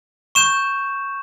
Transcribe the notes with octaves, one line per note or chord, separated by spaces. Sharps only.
C#6 G6 E7